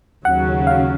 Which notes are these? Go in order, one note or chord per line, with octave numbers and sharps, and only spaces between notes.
D#2 C#3 F#3 F#5
F5